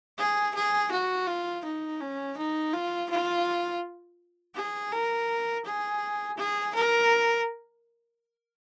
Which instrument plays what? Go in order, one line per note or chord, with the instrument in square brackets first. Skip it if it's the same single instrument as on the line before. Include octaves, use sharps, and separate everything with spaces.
[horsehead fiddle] G#4
G#4
F#4
F4
D#4
C#4
D#4
F4
F4
G#4
A#4
G#4
G#4
A#4